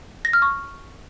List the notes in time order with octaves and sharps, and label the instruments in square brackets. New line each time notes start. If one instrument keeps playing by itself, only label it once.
[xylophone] A#6
F6
C#6